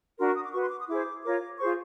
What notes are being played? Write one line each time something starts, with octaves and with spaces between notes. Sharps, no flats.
D4 F#4 A#4 C6
C#6
D#6
D6
F#4 B4 C#6
C6
D6
D#6
E4 G#4 C5 D6
F4 A#4 C#5 D6
F4 G#4 C5 C#6